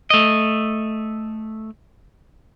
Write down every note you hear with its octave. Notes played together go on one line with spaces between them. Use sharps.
A3 D#5